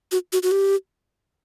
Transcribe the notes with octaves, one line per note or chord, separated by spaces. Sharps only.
F#4
F#4
F#4
G4